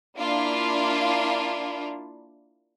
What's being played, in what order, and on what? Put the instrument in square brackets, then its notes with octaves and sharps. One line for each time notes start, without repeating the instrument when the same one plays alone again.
[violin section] A#3 D4 E4 F4